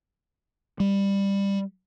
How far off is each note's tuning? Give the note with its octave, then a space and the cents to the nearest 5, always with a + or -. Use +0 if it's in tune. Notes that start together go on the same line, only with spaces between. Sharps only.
G3 +15